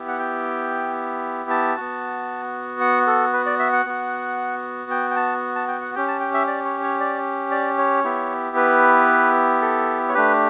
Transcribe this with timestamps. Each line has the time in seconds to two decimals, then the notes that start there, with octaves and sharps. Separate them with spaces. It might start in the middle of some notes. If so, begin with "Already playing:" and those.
Already playing: B3 E4 G4
0.08 F#5
0.19 G5
1.50 A5
1.76 B3 F#4
2.81 F#5
3.07 A4
3.33 B4
3.46 D5
3.59 E5
3.73 F#5
3.86 B3 F#4
4.91 G5
5.11 G5
5.16 A5
5.56 A5
5.68 G5
5.81 F#5
5.95 C#4 G4 G5
6.08 A5
6.20 G5
6.34 E5
6.47 D5
6.65 C#5
6.83 C#5
7.00 D5
7.51 D5
7.78 C#5
8.04 B3 E4 G4
8.56 B4
9.62 A4
10.09 C#5
10.14 A3 D4 G4 B4